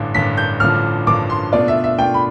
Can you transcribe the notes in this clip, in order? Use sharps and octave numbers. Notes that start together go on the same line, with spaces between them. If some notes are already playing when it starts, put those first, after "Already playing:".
Already playing: A1 G2 D3
A1 G2 D3 B6
G6
A1 G2 D3 F3 F6
A1 G2 D3 F3 D6
C6
B2 A3 D4 F4 D5
E5
E5
B2 A3 D4 F4 G5
B5